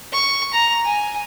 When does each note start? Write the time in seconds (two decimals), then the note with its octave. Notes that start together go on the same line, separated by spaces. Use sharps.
0.13 C#6
0.53 A#5
0.85 G#5